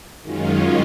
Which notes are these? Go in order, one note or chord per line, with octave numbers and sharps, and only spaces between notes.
F#2 D#3 G#3 C#4 F4